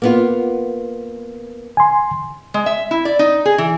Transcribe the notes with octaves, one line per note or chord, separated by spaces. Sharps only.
A#3 B3 F4
G#5 C6
G#3
E5
E4
D5
D#4
G#4
E3